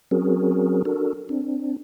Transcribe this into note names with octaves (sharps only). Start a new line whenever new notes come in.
F#3 C4 C#4 F#4 G#4 A#4
D4 F#4 A4 A#4
C4 D4